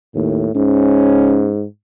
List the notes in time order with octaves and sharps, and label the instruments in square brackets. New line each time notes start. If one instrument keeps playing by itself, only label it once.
[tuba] D#2 [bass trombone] A2
[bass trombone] G#2 [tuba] C#4